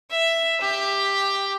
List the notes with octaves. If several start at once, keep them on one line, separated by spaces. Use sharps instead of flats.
E5
G4